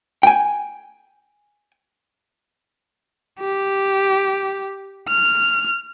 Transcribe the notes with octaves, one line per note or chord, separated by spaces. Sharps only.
G5 G#5
G4
F6